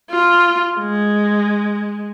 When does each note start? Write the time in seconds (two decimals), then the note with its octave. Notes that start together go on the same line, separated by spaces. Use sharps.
0.11 F4
0.80 G#3